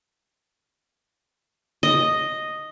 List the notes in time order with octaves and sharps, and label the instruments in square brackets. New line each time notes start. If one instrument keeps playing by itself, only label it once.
[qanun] D#5